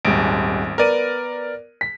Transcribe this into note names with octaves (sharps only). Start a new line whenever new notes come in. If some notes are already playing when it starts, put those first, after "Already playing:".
D#1 G#1 G#4 D7
B3 A#4 D5 D#7
B6